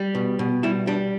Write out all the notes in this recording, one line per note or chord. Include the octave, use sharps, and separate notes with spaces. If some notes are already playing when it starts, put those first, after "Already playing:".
Already playing: G3
B2
B2
G3 E4
G3 D4